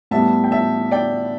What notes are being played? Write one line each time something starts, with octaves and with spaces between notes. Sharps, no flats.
A2 G3 B3 E5 A5
G5
E5 A5
D5 G5